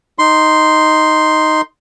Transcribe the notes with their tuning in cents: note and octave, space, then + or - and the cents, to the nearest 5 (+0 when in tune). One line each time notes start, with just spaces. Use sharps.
D#4 +0 C6 +0